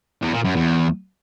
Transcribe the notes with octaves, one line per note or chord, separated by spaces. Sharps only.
E2
A#2
F#2
E2